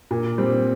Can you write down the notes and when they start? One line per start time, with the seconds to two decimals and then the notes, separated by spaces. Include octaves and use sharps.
0.11 A#2
0.38 G3 C4